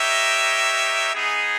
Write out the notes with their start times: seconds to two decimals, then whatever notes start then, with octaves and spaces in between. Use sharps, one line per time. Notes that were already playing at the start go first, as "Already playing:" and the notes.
Already playing: D#4 G4 A#4 C#5 E5
1.14 B3 D#4 G#4